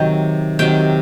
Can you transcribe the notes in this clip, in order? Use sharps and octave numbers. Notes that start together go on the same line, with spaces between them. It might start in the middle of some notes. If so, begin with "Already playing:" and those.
Already playing: C3 D#3 F#3 G5
C3 D#3 F#3 G5